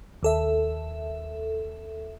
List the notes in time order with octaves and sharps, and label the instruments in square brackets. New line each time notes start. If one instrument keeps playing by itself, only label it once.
[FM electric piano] D#2 A4 E5